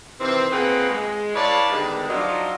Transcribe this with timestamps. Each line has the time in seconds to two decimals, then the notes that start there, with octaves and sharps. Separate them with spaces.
0.20 C3 D#3 E3 C4
0.51 A#2 C4 G#4 B4 F5 F#5
0.89 G#3
1.34 E4 B4 C#5 D5 F5 A5
1.68 D3 D#3 G3 G#3 B3 D4
2.09 F3 F#3 D4 D#4 F4